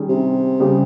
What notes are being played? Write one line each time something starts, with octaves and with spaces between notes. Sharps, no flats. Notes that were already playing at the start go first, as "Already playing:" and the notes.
Already playing: D#3 G3 C#4 G#4
C3
C#3 G3 C4 G4